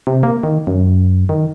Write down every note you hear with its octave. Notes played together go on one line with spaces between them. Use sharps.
C3
A#3
D#3
F#2
D#3